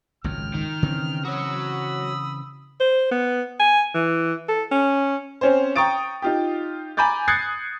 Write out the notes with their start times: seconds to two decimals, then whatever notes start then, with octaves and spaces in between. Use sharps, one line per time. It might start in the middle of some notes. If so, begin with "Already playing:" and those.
0.24 G#1 C#2 F#2 G5 F6
0.54 D#3
0.83 C#3 E3 C4
1.25 F#4 C#5 B5 D#6 E6
2.80 C5
3.11 B3
3.60 G#5
3.94 E3
4.49 A4
4.71 C#4
5.41 C4 C#4 C5
5.76 G5 A#5 C#6 D#6 A6 D7
6.22 D#4 F4 G4
6.97 G#5 A#5 B5 D6 G6 A6
7.28 D#6 F#6 G#6 A6 C7 C#7